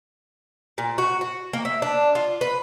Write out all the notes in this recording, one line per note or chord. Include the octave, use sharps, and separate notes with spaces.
A#2
F#4
F#4
A#3
E5
D4
F4
B4